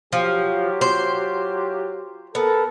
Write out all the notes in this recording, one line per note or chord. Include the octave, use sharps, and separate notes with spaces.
F3 F#3 F4 G4
C5
B3 A4 A#4